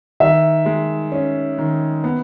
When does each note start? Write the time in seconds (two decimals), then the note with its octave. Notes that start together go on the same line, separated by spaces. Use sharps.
0.20 D#3 E5
0.66 G#3
1.12 C#4
1.58 D#3
2.04 B3